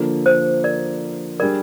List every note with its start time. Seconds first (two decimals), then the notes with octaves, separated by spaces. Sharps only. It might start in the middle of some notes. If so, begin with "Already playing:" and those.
Already playing: D3 F3 A#3
0.26 C5
0.64 A#4 D5
1.40 G3 D4 G#4 A#4 D5